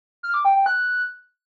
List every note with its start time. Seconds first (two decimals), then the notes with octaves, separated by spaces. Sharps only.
0.23 F6
0.34 D6
0.45 G5
0.55 G5
0.66 F#6